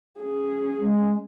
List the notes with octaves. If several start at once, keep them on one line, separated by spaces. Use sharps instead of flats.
C#4 G#4
G#3